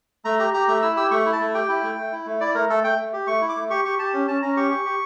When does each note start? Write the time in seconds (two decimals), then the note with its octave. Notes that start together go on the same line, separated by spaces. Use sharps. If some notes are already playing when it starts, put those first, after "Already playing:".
0.25 A3 A#5
0.39 G4 A#5
0.54 G4 A#5
0.68 A3 A#5
0.82 E4 E6
0.97 G4 E6
1.11 A3 C#6
1.26 E4
1.33 A5
1.40 A3
1.54 G4 G5
1.69 E4
1.83 A3
1.98 A3
2.12 E4
2.26 A3
2.41 E4 D5
2.55 A3 A#4
2.69 A3 A4
2.84 A3 G5
2.98 A3
3.13 G4
3.27 A3 C#6
3.41 E4
3.49 D6
3.56 A3
3.70 G4 C#6
3.85 G4 C#6
3.98 G4 A5
4.13 C#4
4.28 C#4 A5
4.42 C#4 A#5
4.56 G4 C#6
4.71 G4
4.86 G4